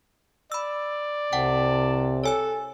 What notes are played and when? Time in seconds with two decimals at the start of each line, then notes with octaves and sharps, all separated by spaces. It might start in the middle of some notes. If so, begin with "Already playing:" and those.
0.52 D5 B5 E6
1.33 C2 C3 F#5 G5 A5
2.24 A4 C#5 G#5 E6